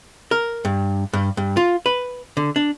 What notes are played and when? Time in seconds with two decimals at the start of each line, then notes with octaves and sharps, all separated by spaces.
0.31 A#4
0.65 G2
1.13 G2
1.37 G2
1.57 F4
1.86 B4
2.37 D3
2.56 D4